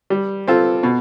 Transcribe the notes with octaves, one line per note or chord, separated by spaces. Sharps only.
G3
C4 F4 A4
B2